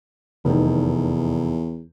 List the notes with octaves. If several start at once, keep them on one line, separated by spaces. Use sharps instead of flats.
F1 E2 D#3